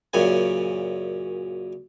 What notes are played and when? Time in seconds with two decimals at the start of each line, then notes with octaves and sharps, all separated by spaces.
0.13 F#2 A#2 C#3 G#5